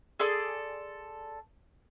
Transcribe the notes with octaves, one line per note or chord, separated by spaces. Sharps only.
G#4 A4 D5 C6